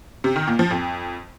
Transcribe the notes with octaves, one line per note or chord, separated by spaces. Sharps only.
C3
D#3
A#2
F3
F2